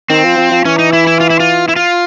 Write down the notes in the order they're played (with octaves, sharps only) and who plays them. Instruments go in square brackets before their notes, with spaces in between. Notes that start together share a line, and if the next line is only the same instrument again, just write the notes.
[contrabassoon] D#3 [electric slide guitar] C4
[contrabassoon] F3
F3
F3
[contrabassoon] E3 [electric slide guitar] C#4
[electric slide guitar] D#4
E4
E4
F4
E4
F4
E4
F4